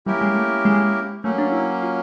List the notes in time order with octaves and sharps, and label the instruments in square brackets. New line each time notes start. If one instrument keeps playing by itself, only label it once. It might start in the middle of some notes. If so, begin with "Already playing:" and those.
[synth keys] G3 [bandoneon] A#3 C#4 E4 G4 A#4
[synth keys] G#3
A3
G#3
[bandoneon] F#3 A#3 C#4 [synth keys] A3
[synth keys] D4
E4
F4